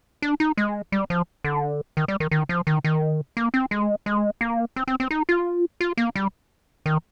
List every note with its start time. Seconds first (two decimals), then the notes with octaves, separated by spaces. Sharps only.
0.22 D4
0.40 D#4
0.57 G#3
0.92 G3
1.10 F3
1.44 D3
1.97 D#3
2.08 G3
2.20 D#3
2.31 D#3
2.49 F3
2.67 D#3
2.84 D#3
3.37 A#3
3.54 C4
3.71 G#3
4.06 G#3
4.41 A#3
4.76 C4
4.88 C4
5.00 C4
5.11 D#4
5.29 F4
5.81 F4
5.97 A#3
6.16 G3
6.86 D#3